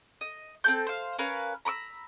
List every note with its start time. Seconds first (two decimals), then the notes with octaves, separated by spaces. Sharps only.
0.21 D#5
0.64 C4 A4 G6
0.87 C5 F5
1.19 C#4 A#4 B4 F5
1.65 A#5 B5 D6 E6